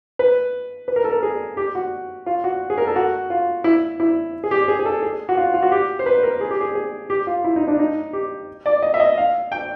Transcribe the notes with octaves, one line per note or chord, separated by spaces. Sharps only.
B4
B4
A#4
A4
A#4
G#4
G4
F#4
F4
F#4
G#4
A#4
A4
F#4
F4
E4
E4
G#4
G4
G#4
G#4
A4
G#4
F#4
F4
F4
F#4
G4
C5
B4
A#4
G#4
G4
G#4
G#4
G4
F4
E4
D#4
D4
D#4
G4
D5
D#5
E5
D#5
F5
G5